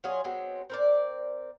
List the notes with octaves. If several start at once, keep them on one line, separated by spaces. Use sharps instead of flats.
F#3 C#4 F4 G#4
F#3 G#3 B3 C4
C4 A#4 D5